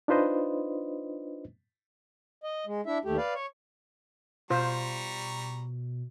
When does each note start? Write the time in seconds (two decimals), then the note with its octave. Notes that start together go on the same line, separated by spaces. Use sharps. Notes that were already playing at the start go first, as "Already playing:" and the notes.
0.08 D4 D#4 F4 B4 C5 D#5
2.44 D#5
2.66 G#3
2.86 D4 E4 E5
3.05 D#2 A3 G4
3.17 B4 D5 F5
3.34 C#5
4.50 B2 G3 F4 C5 A#5 C#6